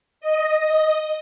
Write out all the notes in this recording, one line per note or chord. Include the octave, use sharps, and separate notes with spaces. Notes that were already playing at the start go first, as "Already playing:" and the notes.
D#5